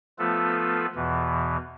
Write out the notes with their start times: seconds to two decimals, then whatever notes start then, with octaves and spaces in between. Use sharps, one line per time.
0.19 F3 A3 B3 F4 A4 B4
0.95 E2 B2 E3